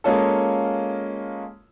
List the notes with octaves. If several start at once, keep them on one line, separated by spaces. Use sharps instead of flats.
G#3 A#3 C#4 F4 A4